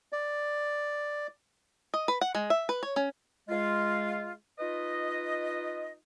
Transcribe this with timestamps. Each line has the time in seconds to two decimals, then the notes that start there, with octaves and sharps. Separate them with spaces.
0.12 D5
1.94 D#5
2.08 B4
2.21 F#5
2.35 G#3
2.50 E5
2.69 B4
2.83 C#5
2.96 C#4
3.49 G#3 F4
4.59 D#4 F4 B4 D#5